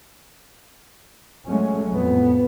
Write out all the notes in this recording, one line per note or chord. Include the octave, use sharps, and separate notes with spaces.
F#3 G#3 A3 C#4
F2 A2 B3